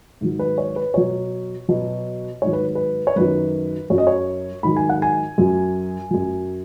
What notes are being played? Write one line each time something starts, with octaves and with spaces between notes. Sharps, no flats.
G#2 D#3 F#3
B4
C#5
B4
B2 F#3 C#5
B2 F#3
G#2 D#3 F#3 C#5
B4
B4
C#5
F#2 D#3 F#3 B4
F#2 F#3 C#5
D#5
C#5
G#2 D#3 F#3 B5
G#5
F#5
G#5
F#2 F#3
F#2 F#3